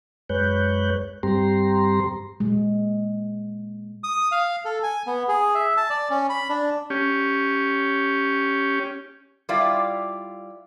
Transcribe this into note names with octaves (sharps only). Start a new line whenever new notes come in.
F#2 G#3 B4 C#5 F#6 G6
G2 G3 C4 G4 A#5 C6
A#2 G#3
D#6
F5
A4
G#5
B3
G#4
E5
A5
D5
C#4
B5
D4
C#4 G4
G3 E4 F4 D5